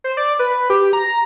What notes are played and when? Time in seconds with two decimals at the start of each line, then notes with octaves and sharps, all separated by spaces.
0.04 C5
0.17 D5
0.39 B4
0.70 G4
0.93 A#5